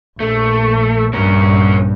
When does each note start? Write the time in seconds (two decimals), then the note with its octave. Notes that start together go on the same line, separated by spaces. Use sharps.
0.20 A#1 A3
1.14 A#1 G2 C#4 A#4